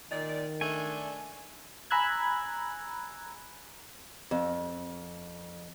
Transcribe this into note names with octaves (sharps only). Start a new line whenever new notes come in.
A#2 D#3 D#4 D5
A3 D4 G#5
G#5 A#5 B5 E6 F#6 G#6
F2